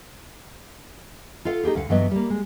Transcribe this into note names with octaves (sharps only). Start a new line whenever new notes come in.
F4 A4 F5 F#5
D#4 F4 G4 G#4
D2 F5 F#5
G2 E3 F#3 B3 D#5 E5
G3 A#3
G#3